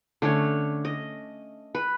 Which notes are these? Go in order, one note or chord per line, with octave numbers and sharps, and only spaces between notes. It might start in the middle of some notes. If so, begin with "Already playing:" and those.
D3 A3 C#4 C#5
D#5
B4